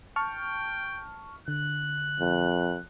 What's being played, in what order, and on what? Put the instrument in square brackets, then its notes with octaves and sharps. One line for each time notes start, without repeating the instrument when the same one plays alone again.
[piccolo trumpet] G5 [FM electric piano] A5 C#6 F6
[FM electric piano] D3 [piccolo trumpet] F#6
[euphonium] F2